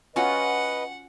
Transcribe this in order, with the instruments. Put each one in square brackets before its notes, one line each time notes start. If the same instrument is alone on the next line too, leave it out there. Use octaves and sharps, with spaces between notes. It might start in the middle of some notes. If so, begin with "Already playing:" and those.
[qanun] C#4 F4 F#4 [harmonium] B4 D#5 [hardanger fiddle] F#5